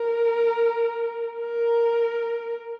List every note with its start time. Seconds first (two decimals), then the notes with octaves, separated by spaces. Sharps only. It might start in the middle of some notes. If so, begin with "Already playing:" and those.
Already playing: A#4
1.40 A#4